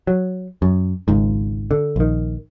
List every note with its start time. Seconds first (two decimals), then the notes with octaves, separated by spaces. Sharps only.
0.07 F#3
0.62 F#2
1.08 G#1 C#2 G#2
1.71 D3
1.96 A#1 D#3